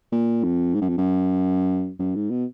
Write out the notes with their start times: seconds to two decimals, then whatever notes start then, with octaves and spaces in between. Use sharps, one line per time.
0.12 A#2
0.44 F2
0.75 G#2
0.82 F#2
0.89 F2
0.98 F#2
1.99 F#2
2.15 G#2
2.31 B2